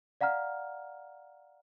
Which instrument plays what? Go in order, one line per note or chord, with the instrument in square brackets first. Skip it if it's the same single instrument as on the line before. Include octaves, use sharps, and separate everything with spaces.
[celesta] D5 F5 F#5 A#5 F6